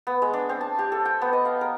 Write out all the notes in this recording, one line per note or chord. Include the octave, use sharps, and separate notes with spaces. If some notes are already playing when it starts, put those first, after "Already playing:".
B3
G#3
D4
C4
A5
G4
A4
G5
B3
D#5
F5
A#4